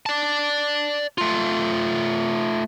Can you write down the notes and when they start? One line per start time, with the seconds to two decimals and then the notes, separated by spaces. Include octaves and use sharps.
0.06 D5 A5
1.18 A3 F4